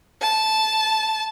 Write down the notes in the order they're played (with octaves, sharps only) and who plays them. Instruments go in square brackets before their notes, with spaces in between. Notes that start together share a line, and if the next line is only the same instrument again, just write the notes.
[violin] A5